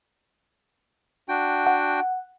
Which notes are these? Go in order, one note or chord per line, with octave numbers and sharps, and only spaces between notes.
D4 F#4 G5
F#5